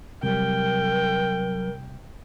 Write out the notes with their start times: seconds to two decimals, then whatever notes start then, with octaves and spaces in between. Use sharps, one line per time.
0.23 C3 F#3 G3 A#4 G5